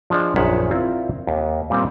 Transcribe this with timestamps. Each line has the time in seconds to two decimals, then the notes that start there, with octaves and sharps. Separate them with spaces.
0.10 F3 D4 G#4 D5 D#5
0.36 A#1 F#2 D#3 C#5 E5 F#5
0.71 C4 E4 F4 A#4 C5 D5
1.27 D#2
1.70 A#2 G3 C4 A#4